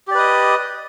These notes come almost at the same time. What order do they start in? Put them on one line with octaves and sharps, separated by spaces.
G4 D5 B4 D#5